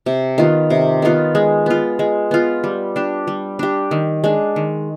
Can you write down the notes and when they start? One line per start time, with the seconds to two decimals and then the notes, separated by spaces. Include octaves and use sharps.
0.06 C3
0.38 D#3 B3 F4
0.70 C3
1.02 D#3 B3 F4
1.35 G#3
1.66 B3 F4
1.99 G#3
2.31 B3 F4
2.64 G3
2.96 D4 G4
3.27 G3
3.59 D4 G4
3.91 D#3
4.24 G#3 D4
4.56 D#3